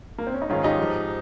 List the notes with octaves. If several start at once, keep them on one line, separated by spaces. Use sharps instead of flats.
A#3
C4
C#4
D#4
G#2 D#3 C#4 F4
D#4 G4
G#2 F3